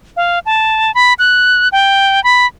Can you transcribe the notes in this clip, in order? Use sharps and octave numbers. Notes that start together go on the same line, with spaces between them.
F5
A5
B5
F#6
G5
B5